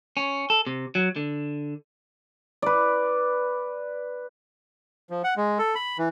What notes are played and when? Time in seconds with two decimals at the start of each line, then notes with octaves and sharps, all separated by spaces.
0.17 C#4
0.50 A4
0.67 C3
0.95 F#3
1.16 D3
2.62 B4 D5
5.10 F3
5.24 F#5
5.37 G#3
5.59 A4
5.75 B5
5.99 E3